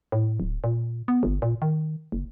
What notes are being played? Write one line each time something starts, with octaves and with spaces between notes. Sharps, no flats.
A2
D1
A#2
B3
G1
A#2
D#3
F#1